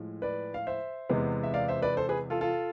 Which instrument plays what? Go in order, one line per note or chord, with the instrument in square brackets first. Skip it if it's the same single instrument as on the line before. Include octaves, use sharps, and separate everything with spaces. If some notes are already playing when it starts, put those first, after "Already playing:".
Already playing: [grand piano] A2 F3 G#3
B4 D5
F5
C5 E5
E2 C3 G#3 B3
E5
D5 F5
C5 E5
B4 D5
A4 C5
G#4 B4
F4 A4
F4 A4